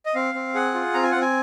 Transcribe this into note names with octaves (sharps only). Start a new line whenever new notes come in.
D#5
C4 F5
C4
G#4 F#5
F4
C4 A#5
G#5
C4 F#5
G#5